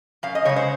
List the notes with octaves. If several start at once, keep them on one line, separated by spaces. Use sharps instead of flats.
F#2 F5
D#5
C#3 G#3 C#5
C5